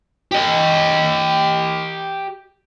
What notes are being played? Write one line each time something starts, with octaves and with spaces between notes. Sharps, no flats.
G4 D#5